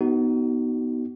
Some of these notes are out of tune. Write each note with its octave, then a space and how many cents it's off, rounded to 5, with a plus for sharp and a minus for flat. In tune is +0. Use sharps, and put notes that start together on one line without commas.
B3 +0 D#4 +0 F#4 +35